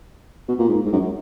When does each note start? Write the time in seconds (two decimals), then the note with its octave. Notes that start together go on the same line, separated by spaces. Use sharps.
0.48 B2
0.59 A#2
0.69 G#2
0.85 G#2
0.92 F#2